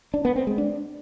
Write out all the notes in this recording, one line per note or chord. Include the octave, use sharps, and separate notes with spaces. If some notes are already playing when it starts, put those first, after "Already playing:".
D4
B3
C4
G#3
D4